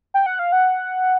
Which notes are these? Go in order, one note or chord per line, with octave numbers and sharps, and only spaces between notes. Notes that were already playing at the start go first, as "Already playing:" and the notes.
G5
F#5
F5
F#5